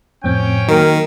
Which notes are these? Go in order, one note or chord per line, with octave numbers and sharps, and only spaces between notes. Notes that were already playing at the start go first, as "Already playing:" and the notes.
F2 A2 C4 C#4 G5
D#3 F#3 A#3 A#4